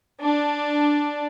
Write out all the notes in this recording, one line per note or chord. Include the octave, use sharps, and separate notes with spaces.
D4